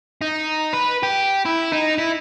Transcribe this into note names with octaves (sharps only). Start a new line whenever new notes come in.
D#4
B4
G4
E4
D#4
E4